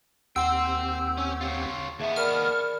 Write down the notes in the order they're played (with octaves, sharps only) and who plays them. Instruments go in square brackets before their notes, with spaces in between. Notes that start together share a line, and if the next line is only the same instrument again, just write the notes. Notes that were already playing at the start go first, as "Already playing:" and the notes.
[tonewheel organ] D#2 C4 G4 [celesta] F#5 [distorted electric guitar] G5 C6 [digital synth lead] E6
[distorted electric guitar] C#4
F4 C#5
[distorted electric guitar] D#2 B3 [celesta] G#4 E5 [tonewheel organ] A5 C#6
[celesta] A#4 D5 B5 [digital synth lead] F6